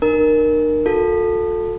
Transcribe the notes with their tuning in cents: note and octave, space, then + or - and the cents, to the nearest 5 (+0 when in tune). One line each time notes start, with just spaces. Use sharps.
D#4 -40 A#4 +5
F#4 -45 A4 +5